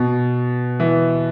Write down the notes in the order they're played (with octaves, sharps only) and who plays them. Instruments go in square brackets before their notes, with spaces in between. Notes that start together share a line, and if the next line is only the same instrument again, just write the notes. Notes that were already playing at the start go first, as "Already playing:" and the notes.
Already playing: [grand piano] B2
E3